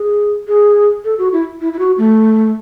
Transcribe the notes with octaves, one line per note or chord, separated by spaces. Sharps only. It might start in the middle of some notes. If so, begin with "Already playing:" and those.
Already playing: G#4
G#4
A4
F#4
E4
E4
E4
F#4
A3